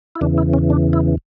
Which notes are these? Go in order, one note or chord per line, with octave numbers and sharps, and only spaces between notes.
E4
E2 C#3 E3 D4
E4
C#4
D4
E4